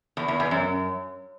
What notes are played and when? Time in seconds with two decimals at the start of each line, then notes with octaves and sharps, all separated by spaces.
0.17 E2
0.28 E2
0.40 E2
0.51 F#2